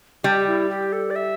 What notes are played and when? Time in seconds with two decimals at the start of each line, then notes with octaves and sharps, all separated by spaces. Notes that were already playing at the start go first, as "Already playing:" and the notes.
0.24 G3 G4
0.48 E4
0.69 G4
0.93 A4
1.10 D5
1.16 E5